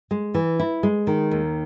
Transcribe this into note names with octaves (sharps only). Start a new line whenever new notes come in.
G#3
E3
E4
G#3
D#3
D#2